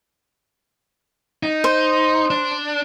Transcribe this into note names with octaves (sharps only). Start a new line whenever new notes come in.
D#4
C5
D4